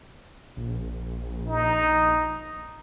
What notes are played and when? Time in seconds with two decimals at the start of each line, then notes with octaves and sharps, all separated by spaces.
0.57 A#1
1.49 D#4